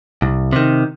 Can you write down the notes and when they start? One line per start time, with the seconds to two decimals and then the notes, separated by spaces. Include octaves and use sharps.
0.22 C2
0.53 C3 D#3